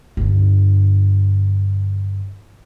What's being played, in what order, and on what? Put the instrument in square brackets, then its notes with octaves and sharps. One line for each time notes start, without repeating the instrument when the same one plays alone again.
[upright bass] G2 D3